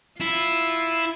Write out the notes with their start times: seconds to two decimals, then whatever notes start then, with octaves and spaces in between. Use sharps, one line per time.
0.20 E4 F4